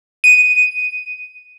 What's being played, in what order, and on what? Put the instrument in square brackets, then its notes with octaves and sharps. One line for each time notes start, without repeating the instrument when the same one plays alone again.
[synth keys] D#7